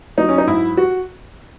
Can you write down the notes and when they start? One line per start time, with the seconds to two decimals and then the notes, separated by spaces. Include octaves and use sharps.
0.18 F#3 D#4
0.29 C#4
0.38 D#4
0.47 G#2 E4
0.77 F#4